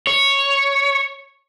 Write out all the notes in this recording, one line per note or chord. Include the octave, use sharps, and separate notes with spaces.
C#5